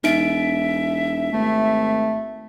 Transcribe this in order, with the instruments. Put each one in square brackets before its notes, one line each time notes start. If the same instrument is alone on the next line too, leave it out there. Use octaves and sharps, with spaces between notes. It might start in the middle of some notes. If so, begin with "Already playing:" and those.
[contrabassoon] E1 [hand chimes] D#4 D7 [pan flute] E5
[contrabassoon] G#1 [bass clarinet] A3